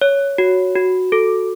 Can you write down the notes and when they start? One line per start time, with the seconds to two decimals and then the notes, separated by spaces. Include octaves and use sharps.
0.01 C#5
0.38 F#4
0.75 F#4
1.12 A4